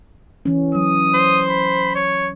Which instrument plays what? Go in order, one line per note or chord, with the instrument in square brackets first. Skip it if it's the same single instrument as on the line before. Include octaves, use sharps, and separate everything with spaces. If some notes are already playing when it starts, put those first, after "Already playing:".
[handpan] E3 C#4
[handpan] F#3 [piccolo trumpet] D#6
[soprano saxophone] C5
[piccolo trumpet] B5
C#5